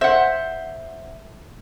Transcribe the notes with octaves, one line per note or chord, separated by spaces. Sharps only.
C5 E5 F#5